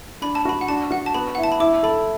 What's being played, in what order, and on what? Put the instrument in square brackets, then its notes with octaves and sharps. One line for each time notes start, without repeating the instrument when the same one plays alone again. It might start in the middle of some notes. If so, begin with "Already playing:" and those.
[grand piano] D4 [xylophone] B5
[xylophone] A5
[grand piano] F#4 [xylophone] B5
[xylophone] F#5
[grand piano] D4 [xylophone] A5
[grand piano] F#4 [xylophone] F#5
[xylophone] A5
[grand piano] B3 [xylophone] B5
[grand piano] E4 [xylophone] F#5
[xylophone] A5
B5
[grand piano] E4 [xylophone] D6
[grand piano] A4 [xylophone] B5